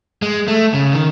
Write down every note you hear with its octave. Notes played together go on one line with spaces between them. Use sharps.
G#3
A3
C#3
D#3